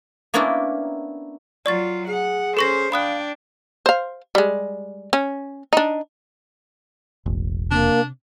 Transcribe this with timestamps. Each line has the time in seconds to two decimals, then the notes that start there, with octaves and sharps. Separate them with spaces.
0.34 A#3 B3 C#4 D4 E4 A#4
1.66 F#3 F4 D5 C#6 A6
2.08 G#4 F#5
2.57 C#4 A4 C5 C#6 A#6
2.92 D4 F5 G5 B5 D#6 F#6
3.86 C5 F5
4.35 G3 G#3
5.13 C#4
5.73 D4 D#4
7.26 E1 A1
7.71 C3 A#3 D4